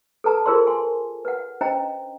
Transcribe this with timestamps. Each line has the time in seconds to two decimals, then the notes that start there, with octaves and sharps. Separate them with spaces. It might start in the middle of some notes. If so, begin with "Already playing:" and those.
0.24 A4 B4 A5 A#5
0.46 F4 G#4 A#4 C5 D5 C6
0.67 G#5 C6
1.25 B4 F#5
1.61 C#4 D4 C5 D#5 G5 A#5